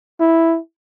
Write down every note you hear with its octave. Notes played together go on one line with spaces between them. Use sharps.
E4